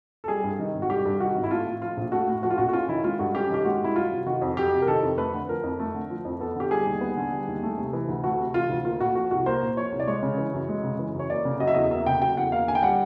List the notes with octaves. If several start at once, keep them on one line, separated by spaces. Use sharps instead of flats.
A4
G3 G#4
G2
D#3
G#1
F#4
G3 G4
G2
D#3 F#4
G#1
E4
A3 F4
A2
F3 F4
A#1
A3 F#4
A2
F3 F#4
F4
A#1 F#4
F#4
C#4 F4
D#3 E4
G#3 F4
G2 F#4
C#4 G4
D#3 G4
G#3 F#4
G2 E4
F#3 F4
C3
D#3 F#4
F2
F#3 G4
C3
A#4
D#3 A4
F2
A3 B4
D3
F3 A#4
F2
A3
D3
F3
F2
B3 A4
D3 G4
G3 G#4
D#2
B3
D3
G3
D#2
A3
C3
E3
D2
A3 F#4
C3
E3 F4
D2
A#3 F4
A#2 F#4
F3 F#4
C2 F#4
A#3 C5
A#2
F3 C#5
C2
D5
G#3 C#5
C#3
E3
F#2
G#3
C#3
E3
F#2 C#5
A#3 D5
C#3
F#3 D#5
E5
E2 D#5
A#3 E5
C#3 G5
F#3 G5
E2 F#5
A#3 F5
D3 G#5
G5
G3 F#5